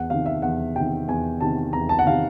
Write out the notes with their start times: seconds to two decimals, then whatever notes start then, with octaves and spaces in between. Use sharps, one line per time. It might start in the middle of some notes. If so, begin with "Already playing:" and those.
Already playing: E2 F#5
0.10 C3 D#3 F5
0.26 E5
0.42 E2 F#5
0.76 C3 D#3 G5
1.08 E2 G#5
1.41 C3 D#3 A5
1.73 E2 A#5
1.89 A5
1.99 F#5
2.06 C3 D#3 F5